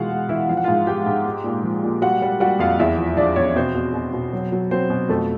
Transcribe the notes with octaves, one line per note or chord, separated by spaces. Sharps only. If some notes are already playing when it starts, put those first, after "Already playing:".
Already playing: B2 E3 G#3 F4 F#4 F5 F#5
G#3
E3 E4 E5
F3 F5
F#5
G#2 F4 F5
G#3 G4 G5
G#2
G#3
A#2
F3
A#2
G3 F#4 F#5
G3
G3 F#4 F#5
F2 F4 F5
E2 E4 E5
F3
F3 D4 D5
E2 C#4 C#5
B2 C4 C5
B2
B2
B2
F#3
F#3
F#3 C4 C5
B2
F2 A3 A4